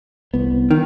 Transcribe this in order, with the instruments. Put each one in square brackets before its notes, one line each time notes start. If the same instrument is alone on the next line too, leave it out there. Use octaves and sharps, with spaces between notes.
[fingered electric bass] C2 B3
[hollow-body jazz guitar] D#3